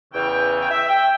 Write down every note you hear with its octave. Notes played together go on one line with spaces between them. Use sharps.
E2 C#3 E3 G5
G5
E5
G5